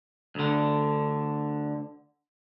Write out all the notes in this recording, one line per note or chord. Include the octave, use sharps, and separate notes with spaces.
D2 D3